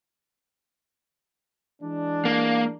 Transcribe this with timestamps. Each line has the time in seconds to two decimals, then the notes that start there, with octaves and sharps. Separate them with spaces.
1.82 E3 G#3 D4
2.25 A#3